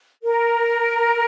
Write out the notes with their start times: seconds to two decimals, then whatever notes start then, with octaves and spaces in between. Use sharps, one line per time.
0.24 A#4